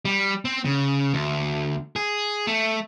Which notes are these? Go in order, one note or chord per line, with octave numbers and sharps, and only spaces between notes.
G3
C4
C#3
D2
G#4
A3